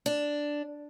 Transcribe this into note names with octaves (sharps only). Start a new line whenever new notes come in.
D4